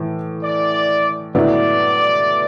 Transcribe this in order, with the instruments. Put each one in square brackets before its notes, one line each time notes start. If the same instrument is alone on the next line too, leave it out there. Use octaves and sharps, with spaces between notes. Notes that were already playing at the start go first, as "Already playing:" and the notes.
Already playing: [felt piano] A2 E3
[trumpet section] D5
[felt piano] A2 F#3 B3 E4 [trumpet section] D5